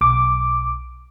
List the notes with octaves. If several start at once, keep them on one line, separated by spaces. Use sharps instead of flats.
B1 D6